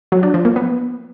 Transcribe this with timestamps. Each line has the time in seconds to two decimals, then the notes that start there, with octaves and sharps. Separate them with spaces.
0.12 F#3
0.23 D4
0.34 F3
0.45 A#3
0.56 B3